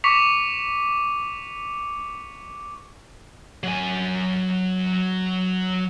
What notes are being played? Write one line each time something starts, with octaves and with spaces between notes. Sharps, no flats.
C#6 D6 B6 C#7 F7
F#3 G#5